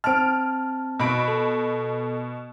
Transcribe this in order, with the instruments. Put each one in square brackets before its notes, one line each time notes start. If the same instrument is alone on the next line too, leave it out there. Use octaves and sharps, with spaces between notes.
[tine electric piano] C4 A5 [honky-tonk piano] F6 D7
[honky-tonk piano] B2 B5 D7
[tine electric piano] A4